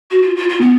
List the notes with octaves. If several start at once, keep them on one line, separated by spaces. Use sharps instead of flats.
F#4
F4
F4
F4
B3